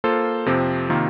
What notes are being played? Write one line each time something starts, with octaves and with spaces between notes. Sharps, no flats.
A#3 F4 A4 C5
F2 C3 F3 C4
C3 D#3 A#3 F4